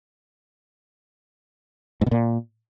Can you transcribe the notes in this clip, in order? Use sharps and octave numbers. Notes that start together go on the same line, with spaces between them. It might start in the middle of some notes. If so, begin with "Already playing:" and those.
G#2
B2
A#2